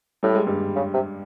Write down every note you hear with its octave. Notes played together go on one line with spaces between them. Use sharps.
A2 G3
G#3
G2 G3
C#3
C3